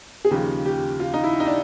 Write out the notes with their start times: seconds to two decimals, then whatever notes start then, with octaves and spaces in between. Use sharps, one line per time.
0.25 G#4
0.31 D#2 C#3 F3 G4
0.65 G4
1.00 F4
1.14 D#4
1.24 E4
1.40 D#4
1.46 D4